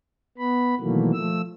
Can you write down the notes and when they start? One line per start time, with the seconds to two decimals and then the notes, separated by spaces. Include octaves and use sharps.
0.38 B3 B5
0.80 B2 D#3 E3 F#3 A3 A#3
1.13 F3 A3 E6